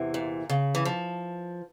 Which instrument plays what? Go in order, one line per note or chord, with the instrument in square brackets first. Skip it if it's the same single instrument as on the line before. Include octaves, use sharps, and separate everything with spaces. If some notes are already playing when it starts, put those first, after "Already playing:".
Already playing: [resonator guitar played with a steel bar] E2 C3 E3
[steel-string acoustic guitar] A#2
C#3
E3
F3